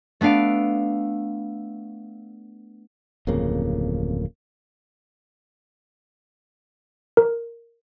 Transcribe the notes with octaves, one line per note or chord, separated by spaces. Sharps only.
A3 B3 D4 F5 D7
D1 F2 C#3 A#3
A#4